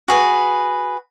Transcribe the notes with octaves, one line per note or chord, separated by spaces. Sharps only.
F#4 G#4 B4